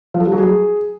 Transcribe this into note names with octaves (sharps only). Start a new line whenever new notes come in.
F3
A4
G3
F#3
G#4